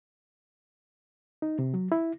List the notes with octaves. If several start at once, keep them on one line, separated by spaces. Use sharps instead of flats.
D#4
C3
F#3
E4